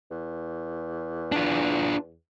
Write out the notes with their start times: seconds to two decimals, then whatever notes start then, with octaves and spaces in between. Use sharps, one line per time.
0.11 E2
1.32 D4 F4